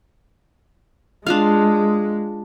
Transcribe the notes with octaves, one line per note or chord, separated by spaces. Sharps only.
G#3 D4 F4 F5